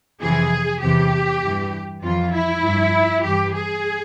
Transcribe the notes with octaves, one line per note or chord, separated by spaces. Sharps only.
F2 C3 E3 G#4
E2 C3 E3 G4
G2 E3
F2 E3 F4
E4
G2 F3
G2 E3 G4
G#4